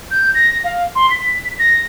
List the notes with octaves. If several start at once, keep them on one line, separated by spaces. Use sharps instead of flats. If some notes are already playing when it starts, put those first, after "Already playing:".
G6
A#6
F5
C6
B6
A#6